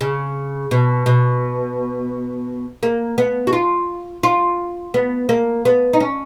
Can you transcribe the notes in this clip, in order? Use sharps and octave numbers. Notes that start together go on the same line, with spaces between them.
C#3
B2
B2
A#3
B3
F#4
F4
F4
B3
A#3
B3
D#4
C#4